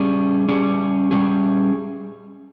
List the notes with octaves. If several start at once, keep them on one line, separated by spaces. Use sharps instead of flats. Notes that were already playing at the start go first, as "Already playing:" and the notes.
Already playing: G3 C#4 G#4
G3 C#4 G#4
G3 C#4 G#4